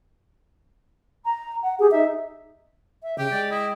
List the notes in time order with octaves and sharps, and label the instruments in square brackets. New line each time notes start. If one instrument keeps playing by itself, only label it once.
[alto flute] A#5
F#5
[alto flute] G4 [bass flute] G#4
[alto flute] D#4 [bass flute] E5
[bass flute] E5
[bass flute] C#3 [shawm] G4 [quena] G5
[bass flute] G#3 [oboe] D5
[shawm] E4 [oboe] D#5